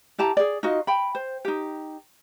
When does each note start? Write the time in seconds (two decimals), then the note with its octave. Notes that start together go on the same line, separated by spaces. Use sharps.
0.18 E4 G4 A5 A#5
0.37 G#4 D5
0.63 D#4 F4 F#4 D#5
0.87 G5 B5
1.15 C5
1.45 D#4 G4